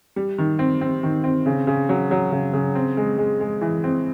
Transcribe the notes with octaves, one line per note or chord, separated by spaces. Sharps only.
G3
D#3
C4
C4
D#3
C4
C#3
C#3
F#3
F#3
C#3
C#3
C4
G#3
G#3
G#3
E3
C4